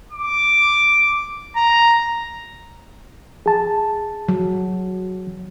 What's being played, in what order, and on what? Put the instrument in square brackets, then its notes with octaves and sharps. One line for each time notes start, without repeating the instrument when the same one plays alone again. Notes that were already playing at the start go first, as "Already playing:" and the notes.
[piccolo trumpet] D6
A#5
[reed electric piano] G#4 A5
[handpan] F#3